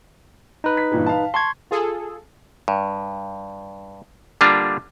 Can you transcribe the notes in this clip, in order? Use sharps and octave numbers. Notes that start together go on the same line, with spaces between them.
D#4 B4
B6
G2 A#2 E3
F5 A5
A5 C6 C#6 G#6
F4 G#4 A4
G2
D3 G3 A#3 D4 F4